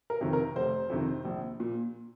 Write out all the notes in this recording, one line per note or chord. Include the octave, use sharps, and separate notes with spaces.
A#4
F2 C3 D#3
A#4
F1 C5
F2 C3 D#3
A#1
A#2